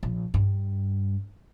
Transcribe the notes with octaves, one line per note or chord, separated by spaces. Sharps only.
A#1
G2